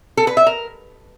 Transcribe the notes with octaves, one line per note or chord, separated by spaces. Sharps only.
A4
B4
E5
A#4